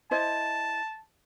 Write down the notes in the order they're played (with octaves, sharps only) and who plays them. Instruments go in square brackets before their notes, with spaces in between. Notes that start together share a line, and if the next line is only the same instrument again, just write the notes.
[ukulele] E4 C5 D#5 [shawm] A5